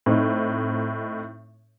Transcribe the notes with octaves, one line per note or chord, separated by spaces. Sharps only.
A2 C4 D#4